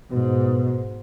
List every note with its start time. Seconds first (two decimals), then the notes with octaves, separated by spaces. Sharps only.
0.11 G#2 B2